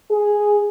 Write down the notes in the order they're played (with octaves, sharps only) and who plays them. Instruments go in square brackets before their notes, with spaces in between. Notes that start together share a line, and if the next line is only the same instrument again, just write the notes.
[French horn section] G#4